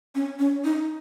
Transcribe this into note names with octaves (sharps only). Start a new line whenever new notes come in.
C#4
C#4
D#4